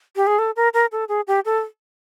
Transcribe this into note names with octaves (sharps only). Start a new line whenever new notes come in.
G4
G#4
A4
A#4
A#4
A4
G#4
G4
A4